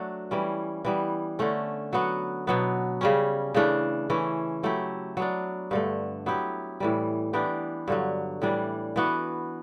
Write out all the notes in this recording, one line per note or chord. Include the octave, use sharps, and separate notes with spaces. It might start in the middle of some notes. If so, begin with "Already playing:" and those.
Already playing: F#3 A3 D4 F#4
E3 G3 C#4
E3 G3 B3
D3 A3 C#4
F#3 B3 F#4
B2 F#3 B3
C#3 G3 C#4
C#3 E3 A3 D4
E3 A3 C#4
F#3 A3 E4 G4
F#3 B3 D4
G2 D3 A3
F#3 B3 E4 G4
A2 E3 G3
E3 B3 D4 G4
G2 D3 F#3
A2 E3 G3 D4
E3 B3 F#4